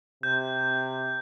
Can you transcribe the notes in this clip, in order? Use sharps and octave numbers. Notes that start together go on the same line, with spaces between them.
C3 G6